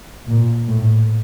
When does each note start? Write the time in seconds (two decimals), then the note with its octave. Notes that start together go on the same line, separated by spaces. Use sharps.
0.28 A#2
0.69 A2